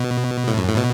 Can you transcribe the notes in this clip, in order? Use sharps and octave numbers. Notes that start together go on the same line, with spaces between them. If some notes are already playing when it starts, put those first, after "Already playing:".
Already playing: B2
A2
F#2
A2
B2